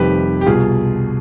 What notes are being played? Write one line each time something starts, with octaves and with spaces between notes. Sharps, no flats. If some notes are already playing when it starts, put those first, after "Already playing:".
Already playing: F1 F2 C3 D#3 G3 G4 B4
G4
C2 B2 G3 F4 G#4